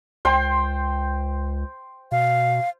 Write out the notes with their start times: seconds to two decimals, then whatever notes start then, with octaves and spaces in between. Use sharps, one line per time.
0.25 C#2 C5 G5 C6
2.12 B2 F5